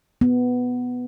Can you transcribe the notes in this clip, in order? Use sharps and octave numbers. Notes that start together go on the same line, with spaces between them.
B3